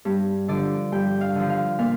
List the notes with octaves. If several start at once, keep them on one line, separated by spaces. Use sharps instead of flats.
G2
D3 F3 D5
G2 G5
F5
D3 F3
F5
A#2 F5